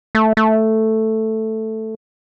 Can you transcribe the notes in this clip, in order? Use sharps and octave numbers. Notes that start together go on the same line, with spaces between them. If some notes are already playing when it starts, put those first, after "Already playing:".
A3
A3